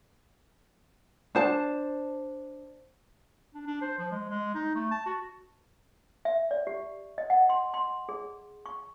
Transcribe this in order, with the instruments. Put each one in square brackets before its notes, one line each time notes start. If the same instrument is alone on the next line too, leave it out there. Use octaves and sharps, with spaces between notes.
[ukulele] D4 C5 A5
[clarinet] D4
D4
C5
F3
G#3
G#3
D#4
A3
A5
F#4
[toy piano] E5
D5
G4
D#5
F#5
C6
C6
G#4
C#6